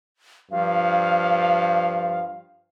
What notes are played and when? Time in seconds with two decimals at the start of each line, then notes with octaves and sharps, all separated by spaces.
0.51 G2 F3 F5